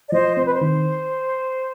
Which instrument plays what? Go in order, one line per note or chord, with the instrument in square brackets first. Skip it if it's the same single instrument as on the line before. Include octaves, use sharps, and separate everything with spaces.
[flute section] D5
[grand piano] F3 [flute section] C5 D#5
[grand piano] C4 [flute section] C5
[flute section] B4
C5
[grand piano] D#3